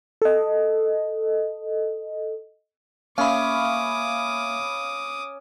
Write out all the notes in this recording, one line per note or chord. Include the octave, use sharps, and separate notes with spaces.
A4 D#5
A#3 C#4 E5 F5 B5 D6 D#6